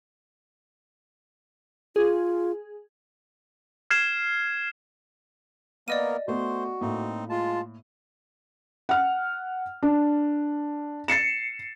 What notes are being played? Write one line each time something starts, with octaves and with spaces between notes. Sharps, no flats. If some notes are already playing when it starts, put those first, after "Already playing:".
F4 G#4
F6 G#6 C7 E7
A#3 B3 A#4 D5 D#5 D#7
A3 B3 F#4 C5 C6
A2 A#3 C4 D#4
G#3 F4 A5
F#5 F6
D4
A6 C7 C#7 E7